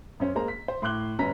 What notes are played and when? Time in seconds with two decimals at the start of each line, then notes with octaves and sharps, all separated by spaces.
0.20 F#2 C#4 C5
0.35 G#3 A#3 C5 A#5
0.48 B6
0.68 C5
0.82 A2 C6 D6 F#6 G7
1.19 G1 C#4 B4 A#5 B6